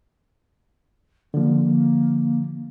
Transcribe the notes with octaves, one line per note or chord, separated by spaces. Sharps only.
D3 F3 A#3